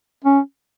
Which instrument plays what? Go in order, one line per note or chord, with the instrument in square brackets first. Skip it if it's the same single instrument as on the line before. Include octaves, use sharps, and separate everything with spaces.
[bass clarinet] C#4